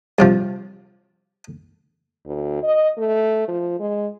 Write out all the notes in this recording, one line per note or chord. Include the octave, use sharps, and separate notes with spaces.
G2 C3 F3
D2
D#5
A3
F3
G#3